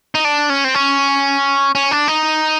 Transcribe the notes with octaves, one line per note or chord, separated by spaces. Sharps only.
D#4
D4
C#4
C4
C#4
C#4
D4
D#4